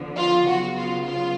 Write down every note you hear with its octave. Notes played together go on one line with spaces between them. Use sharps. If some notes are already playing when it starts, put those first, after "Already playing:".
Already playing: D3 F3 B3
F4
C#3 F#3 B3 F#4
F4
F4